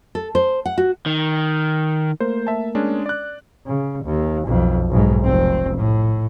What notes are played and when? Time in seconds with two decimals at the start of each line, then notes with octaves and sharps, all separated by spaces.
0.15 A4
0.35 C5
0.66 F#5
0.78 F#4
1.06 D#3
2.20 A3 A#3 A#4 C5
2.47 E5 A5
2.75 G#3 C#4 D4
3.06 D5 F#6
3.67 C#3
4.04 D#2
4.46 B1 F2
4.90 B1 G#2
5.23 F1 C4
5.77 A2